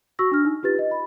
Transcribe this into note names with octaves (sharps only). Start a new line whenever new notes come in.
F#4 C#6 E6 A#6
D4 F6
D#4
F4 G4 B4 A6
D#5
B5